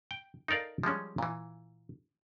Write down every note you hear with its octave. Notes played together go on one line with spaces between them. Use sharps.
G5
D#4 A4 A#4 D5 F5
F3 G3 G#3 C#4
A#2 E3